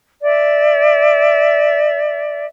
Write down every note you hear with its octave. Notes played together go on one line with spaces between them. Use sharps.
D5 E5